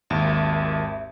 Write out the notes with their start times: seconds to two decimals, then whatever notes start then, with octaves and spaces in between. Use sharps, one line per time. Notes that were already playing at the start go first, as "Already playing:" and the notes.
0.10 G#1 D#2 E5